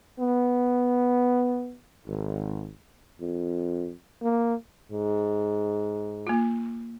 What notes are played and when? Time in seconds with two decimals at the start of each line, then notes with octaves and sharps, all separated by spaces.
0.19 B3
2.07 G#1
3.21 F2
4.22 A#3
4.91 G#2
6.27 A#3 F4